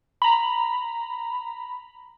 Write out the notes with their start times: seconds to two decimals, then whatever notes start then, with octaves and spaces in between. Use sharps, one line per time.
0.22 A#5 B5